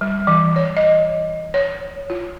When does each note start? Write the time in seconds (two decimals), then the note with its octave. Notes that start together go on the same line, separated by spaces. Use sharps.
0.01 G3
0.27 E3
0.56 C#5
0.77 D#5
1.54 C#5
2.10 F4